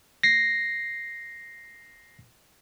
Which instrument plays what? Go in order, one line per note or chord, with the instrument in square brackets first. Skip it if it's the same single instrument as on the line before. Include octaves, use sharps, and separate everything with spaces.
[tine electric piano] A#6 C7